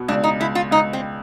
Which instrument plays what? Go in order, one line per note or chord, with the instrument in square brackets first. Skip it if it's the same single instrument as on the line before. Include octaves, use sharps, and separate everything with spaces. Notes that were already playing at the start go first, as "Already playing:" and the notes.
Already playing: [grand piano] B2 B3
[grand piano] C#2 [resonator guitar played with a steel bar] D4
[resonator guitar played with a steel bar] D#4
[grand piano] C#2 [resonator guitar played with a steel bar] E4
[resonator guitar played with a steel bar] F4
[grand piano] C#2 [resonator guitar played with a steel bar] D#4
[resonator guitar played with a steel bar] C4